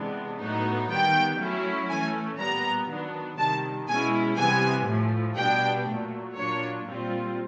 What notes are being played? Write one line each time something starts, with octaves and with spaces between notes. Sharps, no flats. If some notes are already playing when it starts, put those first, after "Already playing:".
Already playing: C3 E3 G#3 B3 D4
A2 F#3 B3 D#4
D#3 G3 B3 G5
F#3 A3 C#4 E4
E3 A3 C#4 G#5
A#2 G3 B3 A#5
D#3 F#3 B3 D4
C3 D#3 G3 A5
B2 G#3 C#4 E4 G#5
C3 E3 G3 B3 G#5
A2 F3 A3
B2 G3 B3 D4 G5
A#2 F#3 A3
A#2 F#3 A#3 D4 F4 C#5
A#2 G3 C4 F4